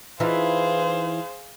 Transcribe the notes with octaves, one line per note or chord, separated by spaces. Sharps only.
E3 D#4 F4 G#4 C5 F5